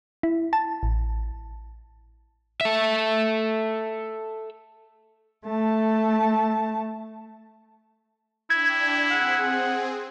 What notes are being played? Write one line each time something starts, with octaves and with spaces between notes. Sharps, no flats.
E4
A5
A1
A4 E5
A3 A5
D4 E4 G5 G#6
C4 G#4 F#5